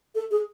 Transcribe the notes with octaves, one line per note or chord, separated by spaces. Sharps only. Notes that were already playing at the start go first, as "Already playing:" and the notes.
A4
G#4